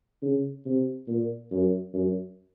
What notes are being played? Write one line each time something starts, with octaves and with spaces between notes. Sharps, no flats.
C#3
C3
A#2
F#2
F#2